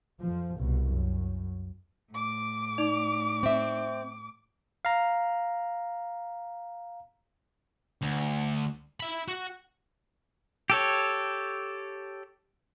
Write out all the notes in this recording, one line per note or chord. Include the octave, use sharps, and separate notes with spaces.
F2 F3
C2 B2
F#2
A2 D6
D#4 D5 F7
C4 E5
F5 A#5
D2
E4 B5
F#4
G4 A4 C#5